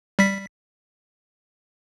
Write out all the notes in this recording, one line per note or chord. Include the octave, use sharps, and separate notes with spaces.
G3 B6